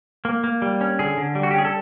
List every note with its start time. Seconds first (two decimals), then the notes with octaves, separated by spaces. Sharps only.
0.25 A#3
0.44 A#3
0.62 G3
0.81 C#4
0.99 D3 G#4
1.17 D3
1.35 G3
1.43 F#4
1.51 G4
1.54 C#4 G#4
1.65 A4